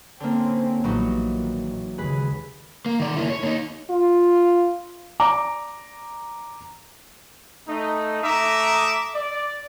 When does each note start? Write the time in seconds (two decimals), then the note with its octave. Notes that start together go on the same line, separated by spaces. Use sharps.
0.20 D3 A#3 C4 C#4
0.84 A#1 E3 F#3 G3 B3 D#4
1.21 A#2 D#3
1.98 D#2 C#3 G#3 G#4 B4
2.86 A#3
3.00 D#3 D5
3.16 A#3 E4
3.30 C#5
3.43 A#3 D#4
3.90 F4
5.20 D5 A#5 D6
7.68 A3 D#4
8.23 A3 E5 A#5 D6 D#6
9.15 D5